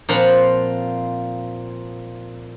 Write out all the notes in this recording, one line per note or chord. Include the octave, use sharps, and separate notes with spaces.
A#2 F3 C4 F4 F#5 B5